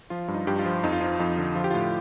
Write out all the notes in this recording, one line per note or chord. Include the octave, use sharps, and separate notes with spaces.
F3 F4
G2
D#4
G2 G4
F4
F3
F2 D#4
F4
F3 D#4
F2 D#4
D3
F3 F4
G4
A2 F4